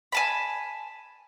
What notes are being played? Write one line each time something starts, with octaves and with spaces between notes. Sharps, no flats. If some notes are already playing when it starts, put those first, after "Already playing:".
G#5 A5 B5